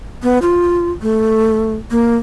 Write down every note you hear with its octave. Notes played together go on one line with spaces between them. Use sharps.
B3
F4
A3
A#3